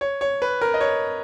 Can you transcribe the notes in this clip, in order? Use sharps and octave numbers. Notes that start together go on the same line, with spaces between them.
C#5
C#5
B4
A#4
D#5
C#5